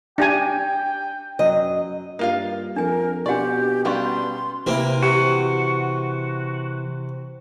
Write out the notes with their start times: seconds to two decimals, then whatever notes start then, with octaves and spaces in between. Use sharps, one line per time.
0.18 D4 G4 G5 G#5
1.39 F#2 F#3 D#5
2.19 G2 A#3 F4 F5
2.76 F2 D4 A#4 G#5
3.26 B2 D4 F#4 G4 D5 F#5 C#6
3.85 G3 B3 C#4 D4 F5 C6 C#6
4.66 C3 E3 A#3 C4 E4
5.03 C3 F#4